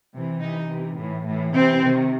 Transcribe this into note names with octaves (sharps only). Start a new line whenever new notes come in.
C3 E3
C3 E3 D#4
C3 E3
A2 E3
A2 E3
C3 E3 C4
C3 D#3